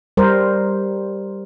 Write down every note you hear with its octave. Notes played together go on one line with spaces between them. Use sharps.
G3 A#4 C5